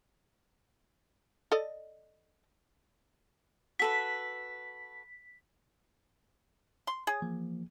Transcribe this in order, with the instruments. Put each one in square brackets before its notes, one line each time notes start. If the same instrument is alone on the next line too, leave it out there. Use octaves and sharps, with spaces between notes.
[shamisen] A4 D5 D#5
[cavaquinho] F#4 A4 B4 [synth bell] B6
[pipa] C6
[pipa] G#4 [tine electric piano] C#5 G#5 D#6
[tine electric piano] E3 F3 A#3